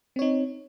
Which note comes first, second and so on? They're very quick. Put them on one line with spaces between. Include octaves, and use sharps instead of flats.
C4 C#5 D#4